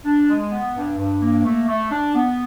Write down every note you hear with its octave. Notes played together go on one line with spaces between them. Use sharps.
D4
G#3
B3
G2
G2
A#3
A3
A3
D4
B3